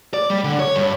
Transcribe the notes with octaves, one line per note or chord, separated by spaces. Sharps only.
D5
G3
D3
C#5
G2